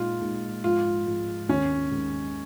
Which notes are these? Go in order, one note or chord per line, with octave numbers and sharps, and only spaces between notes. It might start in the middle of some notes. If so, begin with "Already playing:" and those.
Already playing: A#2 G#3 D#4 F4
A#2 G#3 D#4
G#2 F3 G#3 F4
G#2 F3 G#3
D#2 D#3 G#3 C#4
D#2 D#3 G#3